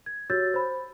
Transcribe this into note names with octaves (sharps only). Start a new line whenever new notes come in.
G#6
F#4 G4 C#5 E6 G6 A6
C5 B5